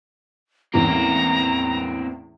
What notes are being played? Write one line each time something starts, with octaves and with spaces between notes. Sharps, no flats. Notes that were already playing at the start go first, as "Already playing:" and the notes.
E2 A2 A#3 C4 C#4 A#5